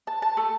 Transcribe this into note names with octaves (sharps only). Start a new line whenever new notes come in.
A5
A5
A3